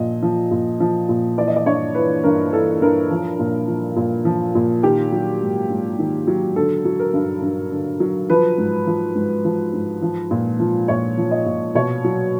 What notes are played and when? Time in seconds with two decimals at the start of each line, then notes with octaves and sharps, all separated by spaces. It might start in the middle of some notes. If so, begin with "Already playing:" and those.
Already playing: A#2 F3 D#5
0.22 F3
0.51 A#2
0.80 F3
1.09 A#2
1.38 E3 D5
1.48 D#5
1.56 D5
1.66 G2 C#5
1.95 E3 B4
2.24 G2 A#4
2.53 E3 A4
2.82 G2 A#4
3.11 F3
3.39 A#2
3.67 F3
3.96 A#2
4.25 F3
4.55 A#2
4.83 D#3 G4
5.12 F#3
5.41 G#2
5.70 G#2
5.99 D#3
6.27 F#3
6.56 D3 A4
6.85 F#3
6.99 A#4
7.14 G2
7.42 G2
7.71 D3
8.00 F#3
8.30 F3 B4
8.58 G#2
8.87 F3
9.15 G#2
9.45 F3
9.74 G#2
10.02 F3
10.31 A#2
10.60 F3
10.88 A#2 C#5
11.17 F3
11.31 D#5
11.46 A#2
11.75 B2 C#5
12.04 F#3